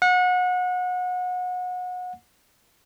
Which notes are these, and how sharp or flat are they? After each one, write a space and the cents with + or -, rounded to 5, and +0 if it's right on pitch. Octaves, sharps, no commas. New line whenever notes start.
F#5 -30